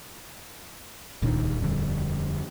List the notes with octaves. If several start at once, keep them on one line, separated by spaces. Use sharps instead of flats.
D#1 C#2 A#2 D#3 D4
F2 D3 G3